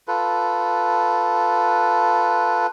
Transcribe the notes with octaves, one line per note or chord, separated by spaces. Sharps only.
F4 A4 B4